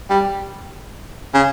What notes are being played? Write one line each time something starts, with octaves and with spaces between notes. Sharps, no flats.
G3
C#3